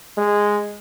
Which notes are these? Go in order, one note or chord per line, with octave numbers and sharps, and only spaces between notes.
G#3